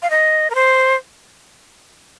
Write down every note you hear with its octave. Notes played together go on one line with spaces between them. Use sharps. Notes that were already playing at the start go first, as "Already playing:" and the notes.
F5
D#5
A#4
C5